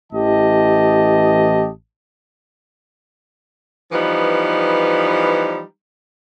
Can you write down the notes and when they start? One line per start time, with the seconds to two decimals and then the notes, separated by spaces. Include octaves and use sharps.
0.12 A1 E3 G4 D#5 A5
3.92 E3 F3 G3 B3 D#4